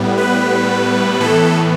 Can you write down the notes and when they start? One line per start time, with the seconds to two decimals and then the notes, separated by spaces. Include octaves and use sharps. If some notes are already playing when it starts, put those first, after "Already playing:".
Already playing: A2 G3 B3
0.17 B4
1.20 A2 E3 B3 A4